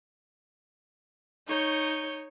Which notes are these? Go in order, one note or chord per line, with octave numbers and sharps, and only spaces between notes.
D#4 C#5 C#6 G6